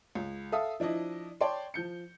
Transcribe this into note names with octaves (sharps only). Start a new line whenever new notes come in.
C#2
A4 E5 F5 D#6
F3 D4 E4 D#5
C#5 D5 G5 A5 C6
F3 G6 C#7